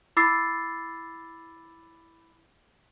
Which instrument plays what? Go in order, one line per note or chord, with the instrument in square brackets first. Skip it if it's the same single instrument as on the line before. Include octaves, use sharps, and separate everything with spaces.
[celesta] E4 B5 D6 E6 A6 C7